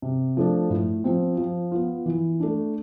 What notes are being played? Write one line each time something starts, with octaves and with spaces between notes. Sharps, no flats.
C3
F3 A3 D4 A4
A2
F3 C4
F3
B3 F4
E3
A3 D4